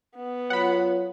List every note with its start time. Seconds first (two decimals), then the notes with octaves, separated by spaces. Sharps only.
0.16 B3
0.50 F#3 F4 C#5 F#5 B5